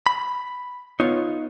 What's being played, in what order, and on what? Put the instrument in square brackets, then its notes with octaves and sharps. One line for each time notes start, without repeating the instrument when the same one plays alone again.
[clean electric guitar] B5
[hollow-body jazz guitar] B3 F4 C#5 [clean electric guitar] D#4